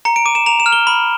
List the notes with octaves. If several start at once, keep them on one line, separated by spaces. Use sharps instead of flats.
A#5 C#7
D7
D6 D#7
E7
A#5 F7
E7
F6
G7
B5